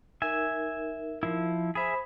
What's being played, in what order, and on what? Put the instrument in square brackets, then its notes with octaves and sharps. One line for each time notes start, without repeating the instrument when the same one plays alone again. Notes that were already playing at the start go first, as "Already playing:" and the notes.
[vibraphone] D#4 A#4 [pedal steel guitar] E5 G#5
[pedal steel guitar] F3 E4
[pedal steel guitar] G#4 E5 [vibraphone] C5 B5